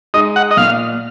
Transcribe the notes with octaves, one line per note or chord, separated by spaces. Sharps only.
G#3 D#4 D#5
F#5
D#5
A#2 F5